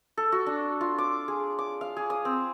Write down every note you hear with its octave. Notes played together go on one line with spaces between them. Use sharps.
A4
F#4
D4
F4
D6
G#4
D6
F5
G#4
D#6
C4